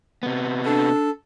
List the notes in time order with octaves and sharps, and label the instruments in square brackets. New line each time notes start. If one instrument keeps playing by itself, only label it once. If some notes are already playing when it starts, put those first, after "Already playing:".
[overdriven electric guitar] C3 B3
[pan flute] D4 [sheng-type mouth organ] A4